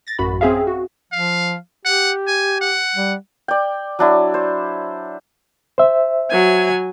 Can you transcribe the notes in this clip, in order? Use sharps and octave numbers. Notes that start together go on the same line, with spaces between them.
A6 A#6
A1 F#2 F#4 B5
C4 C#4 G#4 E5 F5
F#4
F3 F5
G4 F#5
G#5
F#5
G3
D5 G5
F#3 D4 E4
C5
C5 E5
F#3 G#5